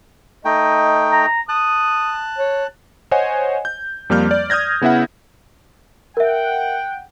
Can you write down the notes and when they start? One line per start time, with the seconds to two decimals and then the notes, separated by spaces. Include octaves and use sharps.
0.45 A3 D#4 D#5 G5
1.12 A#5
1.49 A5 D#6 F#6
2.38 C#5
3.11 C5 C#5 D#5 F#5 G#5
3.65 G6
4.10 F2 G3 A#3 F6 G6
4.31 D5
4.50 D#6 F6 G6 G#6 A#6
4.81 C#3 B3 E4 E5 F#5
6.17 A#4 E5 F#5 G5